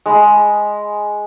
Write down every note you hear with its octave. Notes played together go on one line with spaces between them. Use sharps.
G#3 D#5 B5